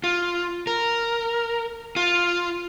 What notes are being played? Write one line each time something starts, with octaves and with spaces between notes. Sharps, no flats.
F4
A#4
F4